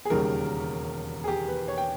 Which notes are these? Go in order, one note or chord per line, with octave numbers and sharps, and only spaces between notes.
G#4
E1 D#2 C#3 G3 A#4
G#4
G4
B4
C#5
G5